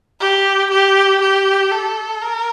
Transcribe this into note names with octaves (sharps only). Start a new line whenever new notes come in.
G4
G4
G4
A4
A#4